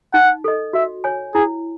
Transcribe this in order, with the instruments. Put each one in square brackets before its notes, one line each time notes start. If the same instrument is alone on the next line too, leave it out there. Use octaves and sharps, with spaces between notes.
[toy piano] D#4 [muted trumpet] F#5
[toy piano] A4 D#5
[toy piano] F#4 [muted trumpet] E5
[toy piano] C#5 G#5
[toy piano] E4 [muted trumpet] G#4